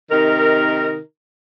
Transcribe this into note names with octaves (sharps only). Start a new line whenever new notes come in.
C3 D#3 D#4 A#4